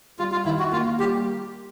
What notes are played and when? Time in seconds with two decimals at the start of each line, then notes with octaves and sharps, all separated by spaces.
0.19 G3 F4
0.32 F4
0.45 D#3 E4
0.59 F#4
0.72 A#3 F4
0.99 G3 G4